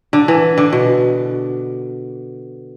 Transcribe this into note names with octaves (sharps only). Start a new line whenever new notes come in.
D3
E3
D3
B2